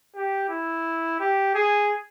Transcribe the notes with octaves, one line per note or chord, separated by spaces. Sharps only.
G4
E4
G4
G#4